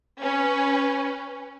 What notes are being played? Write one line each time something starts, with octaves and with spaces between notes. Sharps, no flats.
C#4 B4